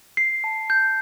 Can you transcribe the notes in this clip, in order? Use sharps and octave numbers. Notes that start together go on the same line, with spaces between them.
C7
A5
G6